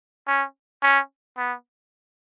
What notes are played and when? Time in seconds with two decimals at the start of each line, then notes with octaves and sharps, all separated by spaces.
0.27 C#4
0.83 C#4
1.37 B3